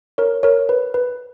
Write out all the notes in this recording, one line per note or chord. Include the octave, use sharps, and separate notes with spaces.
A#4 C#5
A#4 C#5
B4
B4